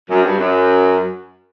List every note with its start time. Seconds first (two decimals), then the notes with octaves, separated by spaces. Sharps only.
0.10 F#2
0.24 G2
0.37 F#2